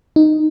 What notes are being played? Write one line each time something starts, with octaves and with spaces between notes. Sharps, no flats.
D#4